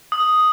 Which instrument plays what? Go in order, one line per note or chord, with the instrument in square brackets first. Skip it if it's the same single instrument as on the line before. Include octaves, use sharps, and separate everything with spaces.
[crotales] D#6